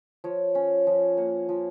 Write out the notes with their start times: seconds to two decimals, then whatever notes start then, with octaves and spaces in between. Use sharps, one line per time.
0.24 F3 C#5
0.55 C#4
0.87 F3
1.17 A#3 F#5
1.49 F3